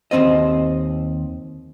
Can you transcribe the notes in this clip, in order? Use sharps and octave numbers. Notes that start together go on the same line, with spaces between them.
D#2 C#3 C4 C5 D#5